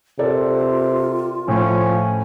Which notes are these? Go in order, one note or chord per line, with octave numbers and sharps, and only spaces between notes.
C3 F4 A4 A#4 D5
A2 F3 C#4